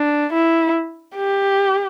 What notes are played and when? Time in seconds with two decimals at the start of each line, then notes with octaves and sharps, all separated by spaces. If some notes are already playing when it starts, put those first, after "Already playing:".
Already playing: D4
0.32 E4
1.16 G4